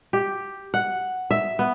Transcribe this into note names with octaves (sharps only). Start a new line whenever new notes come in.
G4
F#5
E5
B3